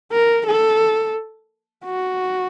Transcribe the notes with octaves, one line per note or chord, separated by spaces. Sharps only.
A#4
A4
F#4